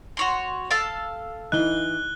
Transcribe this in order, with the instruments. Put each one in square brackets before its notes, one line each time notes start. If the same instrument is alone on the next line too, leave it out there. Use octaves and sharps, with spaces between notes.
[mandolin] F#4 C#5 C6
A4 F5 A5
[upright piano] E3 D#4 [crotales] F#6 G7